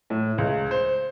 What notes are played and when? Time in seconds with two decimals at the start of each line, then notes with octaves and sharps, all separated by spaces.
0.10 A2
0.38 C#2
0.71 C5